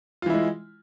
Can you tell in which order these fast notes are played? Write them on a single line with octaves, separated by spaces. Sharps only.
F4 E3 E4 G#3